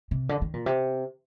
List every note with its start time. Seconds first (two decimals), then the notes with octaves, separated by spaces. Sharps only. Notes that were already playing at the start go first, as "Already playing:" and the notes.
0.11 C3
0.29 D3
0.42 D#3
0.54 A#2
0.66 C3